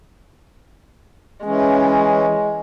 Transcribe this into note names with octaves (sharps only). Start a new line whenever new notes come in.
E3 G#3 C#4